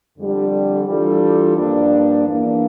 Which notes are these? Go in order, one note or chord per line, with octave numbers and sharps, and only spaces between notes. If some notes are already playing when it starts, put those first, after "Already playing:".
F2 D3 G3 D4
E3 G3 D4 F4 A4
G2 F3 A#3 D4
E2 E3 A#3 D4